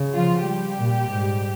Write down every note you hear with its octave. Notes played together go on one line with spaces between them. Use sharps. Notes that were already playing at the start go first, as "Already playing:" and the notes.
Already playing: C#3
F3 F4
G3 G4
A#2
G#2